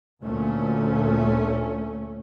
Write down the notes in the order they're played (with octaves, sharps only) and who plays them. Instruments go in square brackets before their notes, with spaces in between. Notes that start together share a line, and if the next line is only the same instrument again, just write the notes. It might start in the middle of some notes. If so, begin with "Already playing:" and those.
[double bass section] D2 A#2 A3 C#4